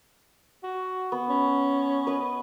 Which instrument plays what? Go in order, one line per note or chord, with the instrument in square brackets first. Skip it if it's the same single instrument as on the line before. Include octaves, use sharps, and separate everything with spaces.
[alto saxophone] F#4
[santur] B3
[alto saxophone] C#4
[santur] B4 D#5